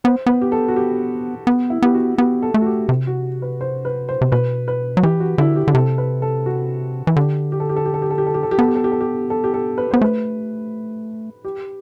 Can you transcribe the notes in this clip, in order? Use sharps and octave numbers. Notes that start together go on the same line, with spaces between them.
B3 C5
B3 B4
G4
A4
F#4
G4
B3
E4
B3 G4
F#4
B3 G4
A4
A3
F#4
G4
C3
F#4
B4
C5
B4
C5
C3
B2 B4
B4
F#3
E3 G4
F#4
D3 E4
G4
D3
C3 A4
B4
A4
F#4
E3
D3 G4
G4
A4
G4
A4
G4
A4
G4
A4
G4
A4
G4
A4
G4
B3 A4
G4
A4
G4
A4
G4
A4
G4
A4
B4
B3 C5
A3 B4
G4